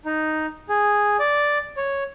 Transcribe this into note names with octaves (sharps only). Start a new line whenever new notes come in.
D#4
G#4
D5
C#5